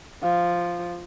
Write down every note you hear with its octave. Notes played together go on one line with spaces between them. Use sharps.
F3 F5